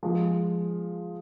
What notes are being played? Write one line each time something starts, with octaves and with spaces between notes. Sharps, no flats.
F3 G#3